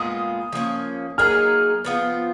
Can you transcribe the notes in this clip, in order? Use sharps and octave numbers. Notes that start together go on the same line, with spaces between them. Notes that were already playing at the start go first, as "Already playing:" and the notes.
Already playing: A#2 G#3 B3 F4 D#6
F3 A#3 C#4
F#3 A#3 D#4 G#4 F6
F3 B3 F4